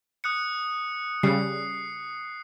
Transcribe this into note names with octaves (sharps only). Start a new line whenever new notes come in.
D#6 F#6 C#7
C#3 G3 C7